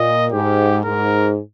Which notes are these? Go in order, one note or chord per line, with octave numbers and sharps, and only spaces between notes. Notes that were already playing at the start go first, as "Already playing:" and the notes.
Already playing: A#2 D#5
G#2 G4
G#2 A#4